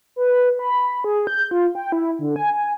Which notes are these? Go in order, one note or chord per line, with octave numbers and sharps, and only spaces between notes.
B4
B5
G#4
G6
F4
G5
E4
D3
G#5
G#5